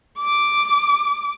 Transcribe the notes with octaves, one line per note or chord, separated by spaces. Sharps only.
D6